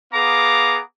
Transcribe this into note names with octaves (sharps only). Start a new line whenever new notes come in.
B3 G#4 F5 A#5 D6